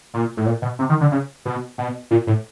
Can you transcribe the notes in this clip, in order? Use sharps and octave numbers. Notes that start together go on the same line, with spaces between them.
A#2
A2
A#2
B2
C3
D#3
D3
C#3
B2
B2
A#2
A2